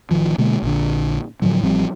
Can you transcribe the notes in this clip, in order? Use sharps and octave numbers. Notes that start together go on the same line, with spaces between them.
A1 D#3 F3
B2 D3 G#3 A#3
A#1 D3
A2 D3 F3 F#3
A1 F3 G3 C4